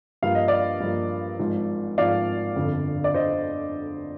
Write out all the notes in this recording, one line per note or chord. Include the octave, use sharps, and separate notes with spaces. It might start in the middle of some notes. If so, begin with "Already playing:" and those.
G2 F3 A#3 F5
D#5
D5 F5
G2 F3 A#3
G#1 G#2 F3
G#1 G#2 F3 D5 F5
G1 F2 D3
D5
D3 C5 D#5